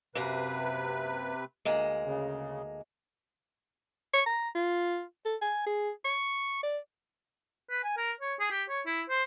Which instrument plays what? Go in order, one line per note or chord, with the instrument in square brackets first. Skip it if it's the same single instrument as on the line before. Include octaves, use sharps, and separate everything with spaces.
[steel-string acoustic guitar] F#2 A#3 [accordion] C3 B4
[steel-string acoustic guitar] D2 G#3 A#3
[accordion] C#3
[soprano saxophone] C#6
A#5
F4
A4
G#5
G#4
C#6
D5
[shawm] B4
G#5
A#4
C#5
G#4
G4
C#5
E4
C5